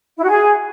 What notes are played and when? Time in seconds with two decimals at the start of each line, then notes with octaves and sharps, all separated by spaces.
0.17 E4
0.23 F#4
0.28 G#4